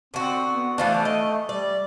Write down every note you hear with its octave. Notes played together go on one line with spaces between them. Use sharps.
D3 C4 F#4
B3
E3 F3 A3 D4
D#5
G3 D5